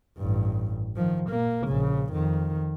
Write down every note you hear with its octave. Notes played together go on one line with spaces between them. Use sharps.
A1 G2
D#3 F3
A#2 A#3
A#1 C#3
F2 D#3